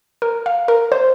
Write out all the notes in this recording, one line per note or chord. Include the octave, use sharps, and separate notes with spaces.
A#4
F5
A#4
C5